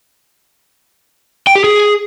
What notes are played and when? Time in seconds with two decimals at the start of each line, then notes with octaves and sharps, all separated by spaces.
1.47 G5
1.55 G4
1.64 G#4